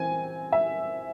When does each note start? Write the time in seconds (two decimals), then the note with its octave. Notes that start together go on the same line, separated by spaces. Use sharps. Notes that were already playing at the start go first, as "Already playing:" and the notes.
Already playing: E3 C4 G#5
0.52 E5